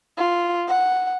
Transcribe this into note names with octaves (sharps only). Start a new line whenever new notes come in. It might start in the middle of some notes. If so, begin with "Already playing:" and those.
F4
F#5